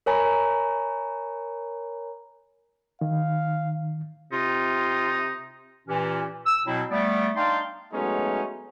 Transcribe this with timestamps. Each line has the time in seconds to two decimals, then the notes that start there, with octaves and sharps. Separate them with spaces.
0.06 A#4 C#5 G#5 A#5 B5
3.01 D#3 F5
4.33 C3 D#4 F4
5.87 A#2 E3 C#4 G4
6.46 E6
6.66 B2 F#3 C4 E4
6.91 G3 A3 B3 D5
7.36 D4 D#4 D5 F5 G5 C6
7.92 F#3 G#3 A3 B3 C#4 D#4